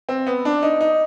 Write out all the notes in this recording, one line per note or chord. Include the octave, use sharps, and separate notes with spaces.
C4
B3
D4
D#4
D#4